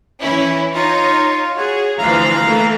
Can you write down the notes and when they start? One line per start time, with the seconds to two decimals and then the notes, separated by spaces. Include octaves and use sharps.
0.20 E3 C#4 E4
0.74 D#4 F4 C#5
1.56 F#4 G#4 C#5
1.98 D2 E3 F3 F5 A#5
2.45 E3 A3 A#3